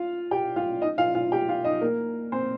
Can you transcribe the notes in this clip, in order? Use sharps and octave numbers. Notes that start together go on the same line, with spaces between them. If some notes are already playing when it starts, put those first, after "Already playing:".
Already playing: F4 F5
G4 G5
F4 F5
D#4 D#5
F4 F5
F4 F5
G4 G5
F4 F5
D#4 D#5
A#3 A#4
C4 C5